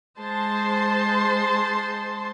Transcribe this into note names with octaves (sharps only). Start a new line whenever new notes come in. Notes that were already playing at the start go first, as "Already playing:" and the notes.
G#3 C5 A5 C6